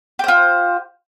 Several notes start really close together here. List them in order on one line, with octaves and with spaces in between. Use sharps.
G4 C5 F4